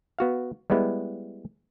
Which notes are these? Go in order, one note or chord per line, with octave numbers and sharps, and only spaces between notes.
B3 F#4 F5
G3 G#3 B3 E4